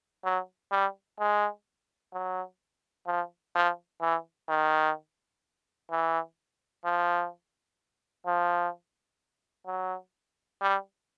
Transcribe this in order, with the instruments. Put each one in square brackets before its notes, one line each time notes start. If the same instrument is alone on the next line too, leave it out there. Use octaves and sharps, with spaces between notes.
[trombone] F#3
G3
G#3
F#3
F3
F3
E3
D#3
E3
F3
F3
F#3
G3